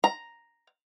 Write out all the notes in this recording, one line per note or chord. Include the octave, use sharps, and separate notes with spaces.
A#5